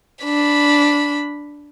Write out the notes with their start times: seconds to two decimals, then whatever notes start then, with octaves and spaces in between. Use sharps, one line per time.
0.24 D4 B5